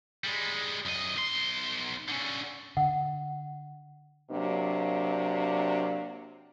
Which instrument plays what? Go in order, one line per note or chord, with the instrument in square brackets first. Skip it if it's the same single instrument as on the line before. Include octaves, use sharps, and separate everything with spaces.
[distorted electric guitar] G3 G#3
F#2 D#5
B1 C6
D3 C#4
[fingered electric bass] D3 [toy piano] F#5
[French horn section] C3 F#3 A#3 D4